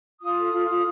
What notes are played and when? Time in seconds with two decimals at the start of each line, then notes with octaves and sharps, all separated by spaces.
0.21 F4 D#6
0.36 A4
0.53 F4
0.69 F4